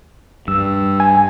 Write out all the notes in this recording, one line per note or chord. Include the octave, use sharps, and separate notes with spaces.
G2 E6
G#5